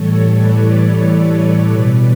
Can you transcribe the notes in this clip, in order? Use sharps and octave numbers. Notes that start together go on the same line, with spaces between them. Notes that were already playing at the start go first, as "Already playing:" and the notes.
Already playing: A2 E3 G3 A4 C#5
B4 D5
B2 G3 B4 D5